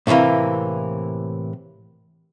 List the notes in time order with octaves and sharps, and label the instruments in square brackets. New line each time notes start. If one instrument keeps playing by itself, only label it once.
[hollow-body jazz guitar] A2 C3 D#3 E3 A#3